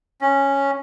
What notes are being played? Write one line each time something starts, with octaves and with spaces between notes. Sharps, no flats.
C#4